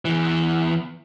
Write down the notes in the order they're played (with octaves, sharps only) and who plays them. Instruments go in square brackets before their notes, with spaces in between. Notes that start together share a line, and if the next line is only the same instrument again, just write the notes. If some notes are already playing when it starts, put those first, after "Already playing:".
[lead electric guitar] E2 E3